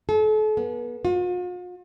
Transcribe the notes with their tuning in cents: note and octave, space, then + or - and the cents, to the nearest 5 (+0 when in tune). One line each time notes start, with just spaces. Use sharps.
A4 -40
B3 -35
F4 +45